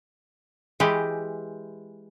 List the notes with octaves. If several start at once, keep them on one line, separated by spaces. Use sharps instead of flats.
E3 G#3 G4 B4